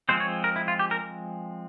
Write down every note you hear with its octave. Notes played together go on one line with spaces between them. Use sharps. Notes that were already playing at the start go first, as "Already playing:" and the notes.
F3 G#3 C4 C5
C#5
A#4
E4
F4
G4
A#4